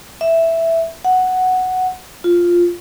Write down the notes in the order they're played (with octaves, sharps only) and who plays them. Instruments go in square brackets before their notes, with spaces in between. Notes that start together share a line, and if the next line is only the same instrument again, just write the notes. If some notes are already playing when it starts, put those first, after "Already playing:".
[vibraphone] E5
F#5
F4